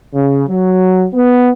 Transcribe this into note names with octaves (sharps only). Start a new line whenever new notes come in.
C#3
F#3
B3